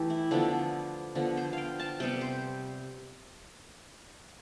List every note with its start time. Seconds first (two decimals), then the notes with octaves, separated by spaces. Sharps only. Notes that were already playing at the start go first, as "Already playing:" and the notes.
Already playing: E3 A3 G4 A4
0.10 E4
0.31 D3 F3 B3 D4
1.15 D3 F3 B3
1.37 C5
1.53 F5 G5
1.80 A5
2.00 C3 G3 B3 G5
2.21 C5